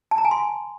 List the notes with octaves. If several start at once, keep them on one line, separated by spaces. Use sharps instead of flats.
A5
A#5
G#5
C6